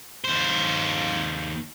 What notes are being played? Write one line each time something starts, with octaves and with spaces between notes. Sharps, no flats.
D#2 C5